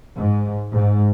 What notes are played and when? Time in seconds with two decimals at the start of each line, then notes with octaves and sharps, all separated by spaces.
0.16 G#2
0.73 G#2